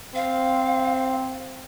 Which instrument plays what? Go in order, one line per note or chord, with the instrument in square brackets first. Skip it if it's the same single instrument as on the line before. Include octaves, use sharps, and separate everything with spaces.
[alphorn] C4 [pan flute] F5